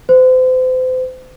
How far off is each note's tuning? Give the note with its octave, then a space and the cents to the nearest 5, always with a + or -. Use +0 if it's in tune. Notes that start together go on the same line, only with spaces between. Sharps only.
C5 -35